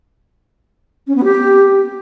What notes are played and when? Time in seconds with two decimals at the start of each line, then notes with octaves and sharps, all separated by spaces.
1.07 C#4
1.15 B3
1.24 G4